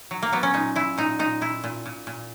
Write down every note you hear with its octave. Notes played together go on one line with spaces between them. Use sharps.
F#3
A#3
F#3 B3
C#4
A#2 D#4
A#2 E4
A#2 D#4
A#2 D#4
A#2 E4
A#2
A#2
A#2